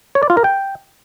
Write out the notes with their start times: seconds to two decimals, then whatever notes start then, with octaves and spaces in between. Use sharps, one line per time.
0.15 C#5
0.23 D5
0.30 F4
0.37 A#4
0.44 G5